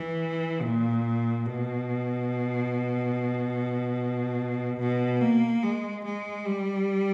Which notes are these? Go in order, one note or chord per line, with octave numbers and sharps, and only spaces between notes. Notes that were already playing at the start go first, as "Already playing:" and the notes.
Already playing: E3
A#2
B2
B2
A#3
G#3
G#3
G3